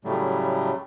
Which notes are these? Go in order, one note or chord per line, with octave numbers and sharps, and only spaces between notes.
A2 C#3 F#3 G3 A3